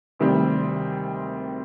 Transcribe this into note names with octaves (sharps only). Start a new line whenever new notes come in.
D2 C3 D#3 G3 C4